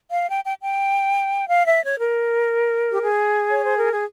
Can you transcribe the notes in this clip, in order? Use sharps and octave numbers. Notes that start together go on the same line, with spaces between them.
F5
G5
G5
G5
F5
E5
C#5
A#4
G4
G#4
C#5
C5
A#4
G#4